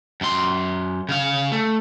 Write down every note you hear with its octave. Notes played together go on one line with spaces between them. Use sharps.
F#2 C6
C#3 F5
A3